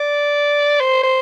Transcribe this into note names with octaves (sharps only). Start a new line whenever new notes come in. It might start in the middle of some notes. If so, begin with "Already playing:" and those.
Already playing: D5
C5
C5